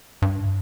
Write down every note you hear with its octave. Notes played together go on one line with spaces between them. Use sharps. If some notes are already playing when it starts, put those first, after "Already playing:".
G2